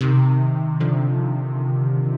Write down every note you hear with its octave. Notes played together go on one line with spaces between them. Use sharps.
C3 D#3
D3 F3